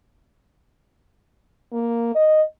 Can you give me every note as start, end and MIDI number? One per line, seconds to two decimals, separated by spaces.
1.72 2.15 58
2.15 2.42 75